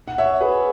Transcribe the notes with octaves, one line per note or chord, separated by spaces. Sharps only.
F#5
C#5 E5
G#4 B4